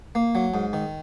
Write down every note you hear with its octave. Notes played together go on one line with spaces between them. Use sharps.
A#3
F#3
G#2
D#3